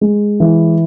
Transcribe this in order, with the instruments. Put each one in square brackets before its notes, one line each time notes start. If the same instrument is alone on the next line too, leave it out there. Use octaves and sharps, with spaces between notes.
[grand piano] G#3
E3